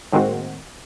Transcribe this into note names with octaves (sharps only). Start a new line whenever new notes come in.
A2 D#3 G#3 A#3 C4 F#4